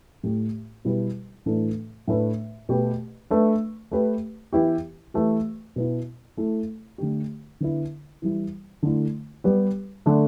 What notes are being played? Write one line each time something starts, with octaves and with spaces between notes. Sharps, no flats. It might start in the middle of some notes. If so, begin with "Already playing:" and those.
A2 A3 G4
B2 G3 E4 G4 B4
A2 E3 A3 D4 A4
A2 A3 D4 B4
B2 A3 G4 B4
A3 D4 B4
A3 G4 B4
E3 B3 E4 G4
E3 A3 G4 B4
B2 B3 E4
A3 E4 A4
D3 A3 G4
D3 B3 E4
E3 G3 E4
D3 A3 E4
G3 B3 G4 B4
D3 A3 D4 A4